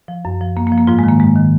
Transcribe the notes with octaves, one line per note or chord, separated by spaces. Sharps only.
F3
F#2
F3
F#2 A#3
A#3
F3
A#3
G#2 F3 F4
G#3
D#3
A#3
G#2 G#3
D#3